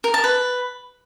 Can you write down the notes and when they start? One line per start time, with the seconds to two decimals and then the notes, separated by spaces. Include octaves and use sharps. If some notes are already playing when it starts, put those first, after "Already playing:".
0.04 A#4
0.14 A5
0.24 B4